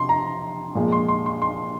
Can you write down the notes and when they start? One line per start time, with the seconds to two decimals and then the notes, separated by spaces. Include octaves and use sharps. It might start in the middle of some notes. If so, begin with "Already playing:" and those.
Already playing: C3 F3 C6
0.09 A#5
0.75 A#2 F3 G#3
0.92 C6
1.08 C6
1.26 C6
1.42 C6